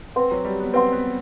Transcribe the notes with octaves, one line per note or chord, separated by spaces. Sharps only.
C4 B4 F#5 C6
F#3
G3
B3
C4 B4 F#5 C6
B3